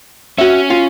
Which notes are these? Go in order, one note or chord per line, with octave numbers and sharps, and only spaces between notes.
C#4 F#4 E5
F4